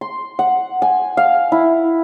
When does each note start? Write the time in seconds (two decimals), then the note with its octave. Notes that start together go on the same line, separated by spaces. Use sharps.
0.01 C6
0.39 F#5
0.82 G#5
1.17 F5
1.52 E4